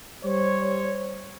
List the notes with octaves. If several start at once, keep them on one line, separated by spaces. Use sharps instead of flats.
G3 C5 C#5